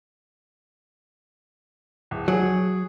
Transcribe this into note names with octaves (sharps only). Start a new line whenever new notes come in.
D1
F#3 G#4